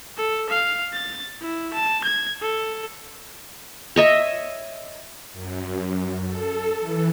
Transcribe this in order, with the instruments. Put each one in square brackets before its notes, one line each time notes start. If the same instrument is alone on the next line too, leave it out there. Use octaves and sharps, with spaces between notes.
[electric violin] A4
F5
A6
E4
A5
G#6
A4
[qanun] C#5 D#5 E5
[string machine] F#2
A4
E3